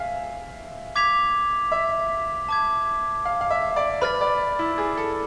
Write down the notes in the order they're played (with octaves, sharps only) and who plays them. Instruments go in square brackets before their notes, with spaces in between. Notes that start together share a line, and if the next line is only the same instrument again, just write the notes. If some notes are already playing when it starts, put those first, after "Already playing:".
Already playing: [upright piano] E5 F5 G#5
[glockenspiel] D6 G#6 B6 F7
[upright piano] E5
[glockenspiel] A5 D6 G#6
[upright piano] F5
F5
E5
D5
[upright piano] B4 [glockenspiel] B5 F6 A6
[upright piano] D5
E4
G#4
A4